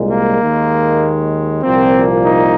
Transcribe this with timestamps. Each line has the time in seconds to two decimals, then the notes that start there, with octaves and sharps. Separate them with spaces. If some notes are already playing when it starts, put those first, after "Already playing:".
Already playing: C2 A#2 G#3
0.11 A#3
0.41 D#2 D#3 G#3
1.63 C2 A#2 F3 A#3 C4
2.25 D#4